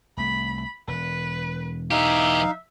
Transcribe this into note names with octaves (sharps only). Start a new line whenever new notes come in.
C2 A3 B5
E1 B4
E3 D#4 G4 E5 F5